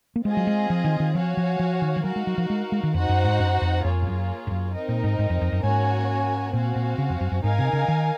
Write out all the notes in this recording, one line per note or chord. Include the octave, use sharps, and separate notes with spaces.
A#3
G#3 C4 F4 G#4 D#5 G#5
F#3
G#3
F3
D#3
D#3
F3 F#4 C#5 F5 G#5
F3
F3
D#3
F3
F#3 D#4 F#4 A#4 F5
G#3
F#3
F3
G#3
G#3
D#3
F2 D#4 F#4 C5 F#5
F#2
G#2
F#2
F2
F2 A#3 F4 G#4 C#5
G#2
F#2
G#2
F#2
C4 D#4 A#4 D#5
A#2
G#2
G#2
F2
F2
F#2
G#2 A#3 C#4 F#4 C#5 G#5
A#2 C4 F#4 C5 F5 G#5
A#2
C#3
F2
F#2
F#2
G#2 D#4 A#4 F5 G#5
C3
C#3
D#3